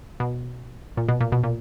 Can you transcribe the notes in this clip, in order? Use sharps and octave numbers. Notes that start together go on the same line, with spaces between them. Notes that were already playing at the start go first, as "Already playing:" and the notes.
B2
A#2
B2
A#2
B2
A#2